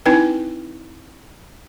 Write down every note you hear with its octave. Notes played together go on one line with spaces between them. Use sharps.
C4 D#4 E4 B4 G5